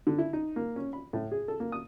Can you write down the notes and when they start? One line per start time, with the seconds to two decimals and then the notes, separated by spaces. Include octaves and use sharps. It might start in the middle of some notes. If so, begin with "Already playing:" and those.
0.07 D3
0.18 E4
0.33 D#4
0.56 A#3
0.76 C#4
0.93 B5
1.13 A2
1.32 G#4
1.48 A4
1.60 A#3
1.72 D#6